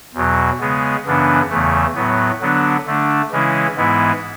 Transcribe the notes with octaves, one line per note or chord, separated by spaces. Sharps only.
E2 B2 F#3
C#3 G#3 B3
F#2 C#3 E3 B3 D4
E2 C#3 E3 A3
A2 F#3 B3
D3 F#3 B3 D4
D3 A3 D4
C#3 E3 G#3 C#4 E4
G#2 E3 G#3 B3 E4